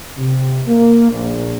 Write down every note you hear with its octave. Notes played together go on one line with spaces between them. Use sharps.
C3
A#3
A#1